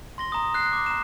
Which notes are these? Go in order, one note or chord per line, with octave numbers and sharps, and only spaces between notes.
C6 A#6 G7
A#5 D#6
F#6 C7
D6
A#5 E7